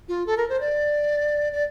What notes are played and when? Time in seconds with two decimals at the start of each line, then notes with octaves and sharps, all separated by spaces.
0.09 F4
0.27 A4
0.37 A#4
0.49 C5
0.60 D5
1.52 D5